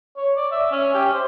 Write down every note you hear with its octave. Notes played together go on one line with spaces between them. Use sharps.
C#5
D5
E5
C#4
G4
C5